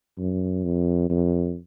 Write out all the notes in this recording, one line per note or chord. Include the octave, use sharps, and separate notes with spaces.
F#2
F2
F2